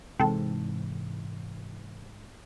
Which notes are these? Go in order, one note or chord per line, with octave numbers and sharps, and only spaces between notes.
G#2 C3 E3 C4 A4